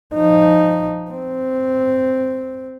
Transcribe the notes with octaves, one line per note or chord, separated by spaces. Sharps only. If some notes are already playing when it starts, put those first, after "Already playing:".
F3 D#4
C4